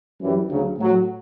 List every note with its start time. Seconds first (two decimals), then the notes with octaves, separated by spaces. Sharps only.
0.21 F#2 E3 G3
0.49 D2 C#3 F#3
0.79 A2 F#3